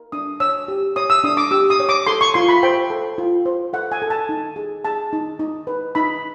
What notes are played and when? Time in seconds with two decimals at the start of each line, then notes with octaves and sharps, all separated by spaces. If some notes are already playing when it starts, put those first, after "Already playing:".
Already playing: A#4
0.12 D4 D#6
0.40 C#5 E6
0.68 G4
0.96 C#5 D#6
1.10 E6
1.24 D4 D#6
1.37 D6
1.51 G4 E6
1.70 D#6
1.80 C#5
1.89 D6
2.07 A4 C6
2.21 C#6
2.34 F4 C6
2.48 B5
2.63 C5 G5
2.90 A4
3.18 F4
3.46 C5
3.73 A4 F#5
3.92 G#5
4.02 A4
4.10 A5
4.29 D#4
4.56 G#4
4.85 G#4 A5
5.13 D#4
5.39 D#4
5.67 B4
5.95 D#4 B5